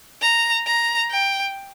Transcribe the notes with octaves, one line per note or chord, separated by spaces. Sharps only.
A#5
A#5
G5